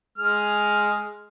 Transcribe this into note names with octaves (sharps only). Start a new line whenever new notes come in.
G#3 G#4 F6